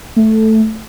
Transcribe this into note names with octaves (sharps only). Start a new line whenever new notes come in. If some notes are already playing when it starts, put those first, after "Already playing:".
A3